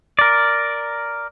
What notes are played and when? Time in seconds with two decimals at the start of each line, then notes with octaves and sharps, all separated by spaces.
0.19 A#4 D5